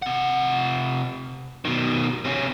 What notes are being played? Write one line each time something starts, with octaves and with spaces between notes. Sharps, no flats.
C3 F#5
B2 D#3
C3 C#4